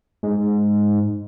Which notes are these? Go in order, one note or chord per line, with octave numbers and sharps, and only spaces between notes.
G#2